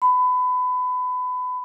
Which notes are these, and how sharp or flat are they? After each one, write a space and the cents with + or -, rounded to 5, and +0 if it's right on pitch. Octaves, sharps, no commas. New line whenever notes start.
B5 +25